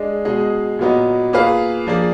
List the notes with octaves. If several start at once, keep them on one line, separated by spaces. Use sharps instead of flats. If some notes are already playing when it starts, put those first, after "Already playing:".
Already playing: G#3 D4 G#4 D#5
B2 G#3 D#4 G#4 D#5
A#2 F#3 B3 D#4
A#3 F4 G#4 B4 F5
F3 A#3 D4 G#4 D5